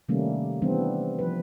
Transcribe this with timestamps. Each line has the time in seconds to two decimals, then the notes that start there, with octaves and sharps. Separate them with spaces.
0.08 C3 D#3 G3 A3 A#3 C#4
0.62 E3 G3 B3 C4 D4
1.19 F3 B4